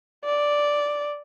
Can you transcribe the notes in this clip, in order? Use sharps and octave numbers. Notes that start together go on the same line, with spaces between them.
D5